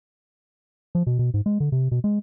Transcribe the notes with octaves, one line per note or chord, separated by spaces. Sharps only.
F3
B2
B2
G#2
G#3
D3
C3
B2
G#3